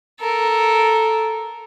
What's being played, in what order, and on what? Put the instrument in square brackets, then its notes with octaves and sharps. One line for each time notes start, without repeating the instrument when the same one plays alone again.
[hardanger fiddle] A4 A#4